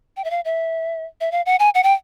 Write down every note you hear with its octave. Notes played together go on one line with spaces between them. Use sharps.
G5
E5
F5
E5
E5
F5
F#5
G#5
F#5
G5